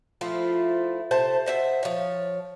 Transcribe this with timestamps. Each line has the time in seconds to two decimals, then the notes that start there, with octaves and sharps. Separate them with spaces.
0.21 F3 A3 E4 F4
1.11 C3 A3 C5 A5
1.46 B2 C5 E5
1.83 F3 C#5